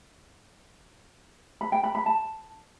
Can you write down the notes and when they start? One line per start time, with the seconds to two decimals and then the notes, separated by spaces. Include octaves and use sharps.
1.61 B5
1.72 G5
1.83 B5
1.95 B5
2.06 A5